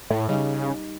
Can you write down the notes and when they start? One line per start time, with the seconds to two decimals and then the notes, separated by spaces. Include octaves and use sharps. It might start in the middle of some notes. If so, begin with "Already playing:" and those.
0.10 A2
0.29 C#3 G3 D#4